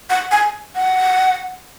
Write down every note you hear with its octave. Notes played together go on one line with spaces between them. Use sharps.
F#5
G#5
F#5